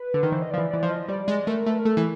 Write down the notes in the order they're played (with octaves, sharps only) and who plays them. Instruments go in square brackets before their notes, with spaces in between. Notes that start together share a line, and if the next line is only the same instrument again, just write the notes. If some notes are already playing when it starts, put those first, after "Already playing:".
Already playing: [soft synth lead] B4
[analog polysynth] D3
D#3
[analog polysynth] E3 [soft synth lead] C5
[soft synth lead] D#5
[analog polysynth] F3 [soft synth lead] D5
[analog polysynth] E3
[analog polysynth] E3 [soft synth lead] D5
[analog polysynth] F3
[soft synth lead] D#5
D#5
[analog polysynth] G3 [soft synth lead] D5
[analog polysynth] G#3
[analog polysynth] A3 [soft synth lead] A#4
[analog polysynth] A3
[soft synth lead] B4
A#4
[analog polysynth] A3 [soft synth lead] A4
[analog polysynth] E3